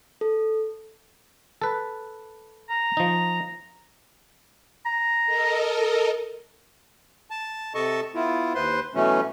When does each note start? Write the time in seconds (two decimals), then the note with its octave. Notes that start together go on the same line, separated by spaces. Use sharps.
0.21 A4
1.62 A4 B4
2.70 A#5
2.97 F3 D#4
4.86 A#5
5.26 A4 A#4 D#5
7.31 A5
7.75 C3 A4 D#5 A5 C#6
8.15 B3 E4 F4
8.55 D#2 B4 C5 C6
8.95 B2 E3 F#3 A3 C#4